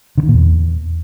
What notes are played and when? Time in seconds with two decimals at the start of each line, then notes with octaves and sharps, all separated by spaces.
0.18 D3
0.23 D#3
0.28 A#2
0.34 E2